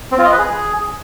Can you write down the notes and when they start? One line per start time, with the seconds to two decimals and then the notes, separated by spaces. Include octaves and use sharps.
0.12 C4
0.18 F4
0.25 D#5
0.32 B4
0.38 G#4